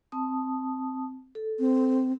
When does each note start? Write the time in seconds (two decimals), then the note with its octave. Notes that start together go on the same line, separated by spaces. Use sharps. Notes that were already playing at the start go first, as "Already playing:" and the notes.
0.12 C4 A5 D#6
1.35 A4
1.59 C4